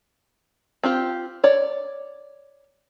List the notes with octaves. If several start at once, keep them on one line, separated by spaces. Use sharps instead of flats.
C4 F4 G4
C#5 D5